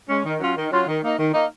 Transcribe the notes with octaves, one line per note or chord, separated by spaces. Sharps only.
G#3 C#4
D#3
F#3 C#4 F4
D#3
F#3 C#4 F4
D#3
A#3 D#4
D#3
A#3 D#4